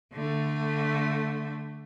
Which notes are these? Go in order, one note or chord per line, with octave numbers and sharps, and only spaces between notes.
D3 A3